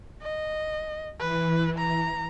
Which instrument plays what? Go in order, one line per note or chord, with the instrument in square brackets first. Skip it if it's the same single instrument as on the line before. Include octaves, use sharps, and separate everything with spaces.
[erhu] D#5
[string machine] E3 [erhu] B4
[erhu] A#5